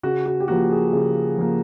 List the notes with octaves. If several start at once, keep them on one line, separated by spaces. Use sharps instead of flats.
C#3 F#4
F#4
G4
F3 A#3 F#4
G#4
C#3
F3 A#3